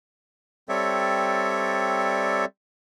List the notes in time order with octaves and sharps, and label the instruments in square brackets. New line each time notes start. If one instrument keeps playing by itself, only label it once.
[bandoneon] G3 C4 A4 C#5 D5 E5